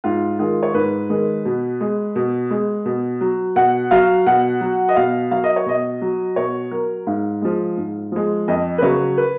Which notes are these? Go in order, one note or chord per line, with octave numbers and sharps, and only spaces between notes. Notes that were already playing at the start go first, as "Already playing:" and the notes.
G#2 F4
D#3 G#3 F4
C#5
G#2 B4
D#3 G#3
B2
G#3
B2
G#3
B2
F#3
B2 F#5
F#3 F5
B2 F#5
F#3
D#5
B2 F5
F#3 F5
D#5
C#5
B2 D#5
F#3
B2 C#5
F#3 A#4
G#2 F5
F3 G#3
G#2
F3 G#3
F2 D#5
B4
C#3 F#3 C#5
B4